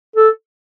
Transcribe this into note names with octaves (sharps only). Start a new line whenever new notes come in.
A4